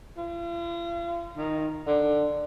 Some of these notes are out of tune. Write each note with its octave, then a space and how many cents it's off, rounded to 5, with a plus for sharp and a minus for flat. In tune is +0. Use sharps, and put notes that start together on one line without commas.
F4 -40
D#3 +0
D3 +15